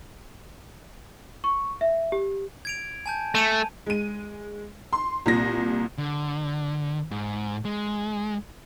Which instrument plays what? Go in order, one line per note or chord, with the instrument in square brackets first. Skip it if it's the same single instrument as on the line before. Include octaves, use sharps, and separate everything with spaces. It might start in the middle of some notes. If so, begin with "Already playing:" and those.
[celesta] C#6
E5
G4
[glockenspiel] G#6 D7 F7
G#5 A5 G6
[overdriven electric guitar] A3 [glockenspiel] A5 D#7 F7
[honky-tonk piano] G#3 D#7
C6
C2 A#2 A#6
[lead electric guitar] D3
G#2
G#3